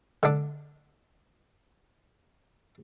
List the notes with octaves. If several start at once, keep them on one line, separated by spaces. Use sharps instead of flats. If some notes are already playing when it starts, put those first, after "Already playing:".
D3 D4